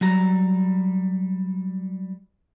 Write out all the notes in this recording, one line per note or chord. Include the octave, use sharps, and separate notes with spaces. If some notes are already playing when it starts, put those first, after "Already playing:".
F#3 G3 A#5